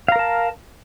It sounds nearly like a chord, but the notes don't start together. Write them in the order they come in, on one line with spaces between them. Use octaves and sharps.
F5 A#5 A#4 A5